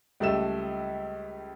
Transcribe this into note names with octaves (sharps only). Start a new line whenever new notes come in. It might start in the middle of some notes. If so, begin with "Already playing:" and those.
C#2 G3 A3 E6 E7